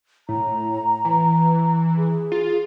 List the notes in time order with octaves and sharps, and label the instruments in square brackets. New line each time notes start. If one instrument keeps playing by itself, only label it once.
[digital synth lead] A2 [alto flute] A#5
[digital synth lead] E3
[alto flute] G#4
[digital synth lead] F4